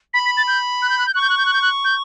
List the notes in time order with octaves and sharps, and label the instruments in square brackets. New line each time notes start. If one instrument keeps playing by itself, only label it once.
[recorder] B5 [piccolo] B6
[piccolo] B6
A6
G6
F#6
G6
F#6
G6
[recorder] C#6 [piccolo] F#6
[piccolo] G6
F#6
G6
F#6
G6
F#6
G6